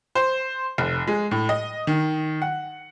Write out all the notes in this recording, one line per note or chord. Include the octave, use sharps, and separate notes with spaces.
C5
F1
G#3
A2
D#5
D#3
F#5